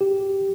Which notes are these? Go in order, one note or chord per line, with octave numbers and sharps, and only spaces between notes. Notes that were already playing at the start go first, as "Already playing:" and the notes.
G4